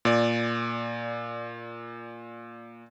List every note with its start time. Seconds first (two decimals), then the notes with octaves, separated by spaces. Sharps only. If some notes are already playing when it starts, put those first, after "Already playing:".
0.05 A#2 D5